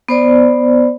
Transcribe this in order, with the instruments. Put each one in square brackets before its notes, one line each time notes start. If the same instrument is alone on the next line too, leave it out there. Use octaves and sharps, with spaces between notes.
[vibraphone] B3 C5 D5